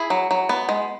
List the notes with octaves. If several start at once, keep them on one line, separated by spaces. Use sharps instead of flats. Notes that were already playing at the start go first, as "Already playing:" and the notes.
Already playing: E4 G#4
F#3
F#3
B3
G#3